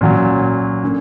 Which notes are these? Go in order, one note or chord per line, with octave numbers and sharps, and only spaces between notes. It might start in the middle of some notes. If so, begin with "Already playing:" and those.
A#2 F#3 C#4
D3 A#3 C#4